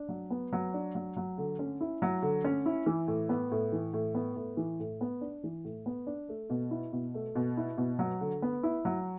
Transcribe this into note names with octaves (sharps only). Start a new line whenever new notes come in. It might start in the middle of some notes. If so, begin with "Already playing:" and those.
Already playing: D4
F#3
B3
F#3
D4
F#3
F#3
D3
C#4
E4
F#3
D3
C#4
E4
E3
A2
B3
A2
E3
A2
B3
A2
E3
A2
B3
D4
E3
A2
B3
D4
A3
B2
E4
B2
A3
B2
E4
B2
F#3
D3
B3
E4
F#3